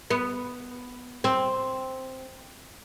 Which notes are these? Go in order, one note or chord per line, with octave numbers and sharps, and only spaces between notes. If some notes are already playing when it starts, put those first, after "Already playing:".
B3
C4